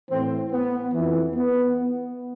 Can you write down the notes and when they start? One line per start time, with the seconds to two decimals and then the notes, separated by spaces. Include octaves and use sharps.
0.10 A2 E3 C4
0.52 B3
0.94 F2 E3
1.35 B3